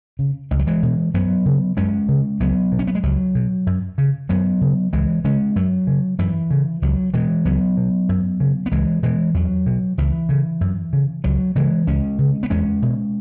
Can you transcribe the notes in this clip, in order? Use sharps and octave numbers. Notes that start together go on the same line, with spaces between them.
C#3
C#2 G#3
F#3
E3 G#3
B2
F#2 F#3 B3
C#3
F#2 G#3 C#4
C#3
C#2 F#3 B3
B2
C#4
B3
G#3
C#2 F#3
B2
F#2
C#3
F#2 F#3 B3
C#3
C#2 E3 G#3
C#3 G#3 C#4
F#2 F#3
C#3
F#2 E3
C#3
C#2 F#3
B2 E3 G#3
C#2 F#3 B3
B2
F#2
C#3
B3
C#2 E3 G#3
B2 E3 G#3
E2 F#3
B2
C#2 E3
C#3
F#2
C#3
C#2 F#3
C#3 E3 G#3
C#2 G#3 C#4
C#3
B3
E2 G#3 C#4
B2